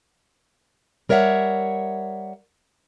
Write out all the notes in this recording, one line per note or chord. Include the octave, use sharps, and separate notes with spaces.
G3 A#4 C#5 E5 F#5